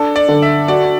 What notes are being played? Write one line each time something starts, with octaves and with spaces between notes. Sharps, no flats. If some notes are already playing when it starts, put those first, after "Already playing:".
Already playing: D4 A4
D5
D3
E5
F#4 D5